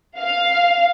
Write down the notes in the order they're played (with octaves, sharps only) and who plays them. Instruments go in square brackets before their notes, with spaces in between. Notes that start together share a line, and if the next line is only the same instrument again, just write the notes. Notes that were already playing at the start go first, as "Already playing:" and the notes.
[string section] F5